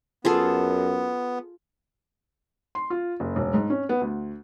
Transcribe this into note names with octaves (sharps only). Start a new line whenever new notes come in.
F#2 B3 F4 G#4 A4
C6
F4
F#1
E1
G#2
C#4
B3
D2